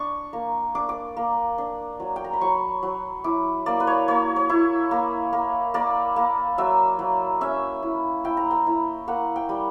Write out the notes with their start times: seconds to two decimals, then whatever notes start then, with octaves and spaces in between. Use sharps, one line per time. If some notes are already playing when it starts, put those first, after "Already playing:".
Already playing: D4 C#6
0.33 A#3
0.75 D4 D6
0.89 D6
1.17 A#3
1.58 D4
2.00 F#3
2.16 G5
2.24 A#5
2.33 B5
2.41 F#3 C#6
2.83 F#3
3.24 E4 D6
3.66 A#3 D5
3.80 B4
3.87 C#5
4.08 A#3 C#5
4.36 C#5
4.49 E4
4.91 A#3
5.33 A#3
5.74 A#3 D5
6.16 A#3
6.58 F#3 E5
6.99 F#3
7.41 C#4 E5
7.83 E4
8.25 E4 G5
8.37 A#5
8.51 G5
8.67 E4
9.08 A#3 F#5
9.36 G5
9.49 G3